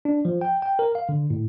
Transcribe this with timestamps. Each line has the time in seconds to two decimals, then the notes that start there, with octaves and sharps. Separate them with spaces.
0.05 D4
0.25 F3
0.41 G5
0.62 G5
0.79 A#4
0.95 F5
1.09 D3
1.30 A2